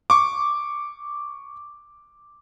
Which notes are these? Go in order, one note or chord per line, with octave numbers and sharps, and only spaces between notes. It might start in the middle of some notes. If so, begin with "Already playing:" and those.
C#6 D6